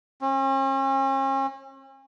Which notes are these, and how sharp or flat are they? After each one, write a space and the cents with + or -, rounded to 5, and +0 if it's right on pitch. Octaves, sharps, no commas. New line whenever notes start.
C#4 -45